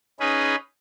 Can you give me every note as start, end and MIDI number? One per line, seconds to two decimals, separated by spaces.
0.20 0.55 61
0.20 0.55 63
0.20 0.55 68
0.20 0.55 71